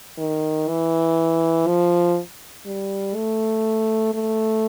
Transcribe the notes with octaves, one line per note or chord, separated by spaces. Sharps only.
D#3
E3
F3
G3
A3
A3